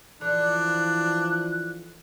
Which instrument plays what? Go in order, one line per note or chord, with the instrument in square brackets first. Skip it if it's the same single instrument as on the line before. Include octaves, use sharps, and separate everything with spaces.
[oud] D3 [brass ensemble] E3 F3 [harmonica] D4 [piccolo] F#6